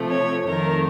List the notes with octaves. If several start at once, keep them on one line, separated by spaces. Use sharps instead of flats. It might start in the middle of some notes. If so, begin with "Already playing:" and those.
Already playing: C3 F3 A3
C#5
F2 D#3 A3 A#4